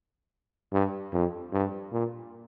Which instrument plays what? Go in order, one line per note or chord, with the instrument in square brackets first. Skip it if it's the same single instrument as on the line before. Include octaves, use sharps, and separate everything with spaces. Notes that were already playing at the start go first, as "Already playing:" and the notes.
[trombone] G2
F2
G2
A#2